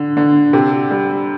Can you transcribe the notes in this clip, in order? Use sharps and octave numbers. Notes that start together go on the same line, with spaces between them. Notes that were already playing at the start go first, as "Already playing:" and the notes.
Already playing: D3
D3
C3
G3